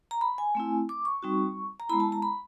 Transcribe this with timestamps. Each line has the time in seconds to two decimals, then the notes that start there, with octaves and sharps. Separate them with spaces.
0.11 A#5
0.21 B5
0.38 G#5
0.55 A3 C4 E4
0.89 D6
1.05 C#6
1.23 G3 C4 D#4 F#4
1.80 A#5
1.89 G#3 B3 E4 B5
2.00 A5
2.12 A#5
2.22 B5